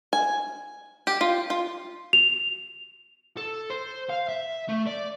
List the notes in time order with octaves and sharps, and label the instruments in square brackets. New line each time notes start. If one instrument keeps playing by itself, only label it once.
[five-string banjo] G#5
G4
F4
F4
[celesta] F7
[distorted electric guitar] A4
C5
F5
E5
A3
D5